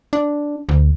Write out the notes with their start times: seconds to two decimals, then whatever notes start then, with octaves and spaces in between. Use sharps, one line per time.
0.13 D4
0.69 D2